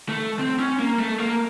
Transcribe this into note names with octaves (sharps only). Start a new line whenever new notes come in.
A3
C4
C#4
A#3
A3
A#3